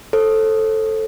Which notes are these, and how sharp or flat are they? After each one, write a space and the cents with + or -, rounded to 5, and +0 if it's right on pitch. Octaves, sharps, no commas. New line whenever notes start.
A4 +0 C5 +40